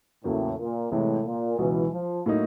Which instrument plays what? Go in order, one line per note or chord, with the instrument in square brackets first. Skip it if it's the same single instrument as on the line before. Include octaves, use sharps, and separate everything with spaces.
[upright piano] E2 C#3 F#3 A#3 [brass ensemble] A2
[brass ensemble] A#2
[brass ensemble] A2 [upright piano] C3 E3 G#3
[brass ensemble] A#2
[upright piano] C#2 B2 F#3 [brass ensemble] E3
[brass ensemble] F3
[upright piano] A2 F#3 A#3 D#4